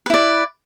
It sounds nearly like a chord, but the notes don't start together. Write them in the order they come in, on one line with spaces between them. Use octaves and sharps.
B4 E4 D5